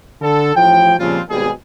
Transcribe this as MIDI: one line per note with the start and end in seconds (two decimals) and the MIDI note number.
0.21 0.54 50
0.21 0.54 69
0.55 0.94 33
0.55 0.94 45
0.55 0.94 53
0.55 0.94 79
0.99 1.19 46
0.99 1.19 49
0.99 1.19 53
0.99 1.19 55
0.99 1.19 60
0.99 1.19 65
1.30 1.50 32
1.30 1.50 39
1.30 1.50 47
1.30 1.50 55
1.30 1.50 68